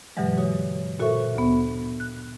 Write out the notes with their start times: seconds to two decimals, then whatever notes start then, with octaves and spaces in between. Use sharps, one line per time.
0.17 G2 B2 D3 E3 F#3 G#3
0.37 F#4 C#5 D#6
1.00 A#2 F#4 A4 C5 E5 C#6
1.35 D2 B3
2.00 F#6